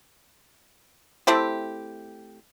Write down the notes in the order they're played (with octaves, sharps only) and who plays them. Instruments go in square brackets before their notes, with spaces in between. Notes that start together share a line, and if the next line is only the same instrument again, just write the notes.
[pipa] A3 C4 E4 G4